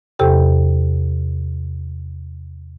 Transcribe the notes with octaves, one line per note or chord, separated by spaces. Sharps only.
E2 C3 G4 A4 G5